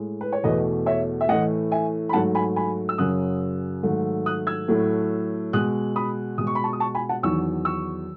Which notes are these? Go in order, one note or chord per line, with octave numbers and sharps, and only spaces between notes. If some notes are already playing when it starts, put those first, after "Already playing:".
Already playing: A2 G#3
B4
C#5
E2 B2 A3 B4 D#5
C#5 E5
E5
A2 E3 A3 D#5 F#5
E5 G#5
B5
G#2 F#3 A3 F#5 A5
G#5 B5
G#5 B5
E6
F#2 C#3 F#3 D#6 F#6
G#2 D#3 F#3 A3
D#6 F#6
E6 G#6
A2 F#3 A3
B2 G#3 D#6 F#6
B5 D#6
B2 G#3 D#6
C#6
B5
A5 C#6
D#6
A5 C#6
G#5 B5
F#5 A5
E2 D#3 F#3 C#6 E6
C#6 E6